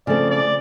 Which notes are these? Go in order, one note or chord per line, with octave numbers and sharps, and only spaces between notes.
C#3 F3 A3 C4 D5
D5